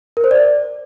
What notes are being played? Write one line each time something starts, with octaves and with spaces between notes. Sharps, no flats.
A#4
C5
D5